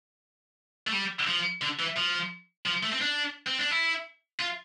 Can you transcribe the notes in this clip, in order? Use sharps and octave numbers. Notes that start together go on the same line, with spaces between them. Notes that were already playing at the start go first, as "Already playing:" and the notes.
A3
G3
F3
D3
E3
F3
F3
A3
C4
D4
C4
D4
E4
F4